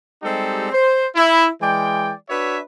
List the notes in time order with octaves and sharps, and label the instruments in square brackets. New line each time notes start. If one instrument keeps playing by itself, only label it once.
[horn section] G3 G#3 C4 D#4 G4 A4
C5
E4
E3 G#3 D5 G5
D4 F#4 B4 C#5 E5